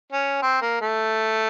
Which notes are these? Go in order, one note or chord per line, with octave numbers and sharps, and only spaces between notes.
C#4
C4
A#3
A3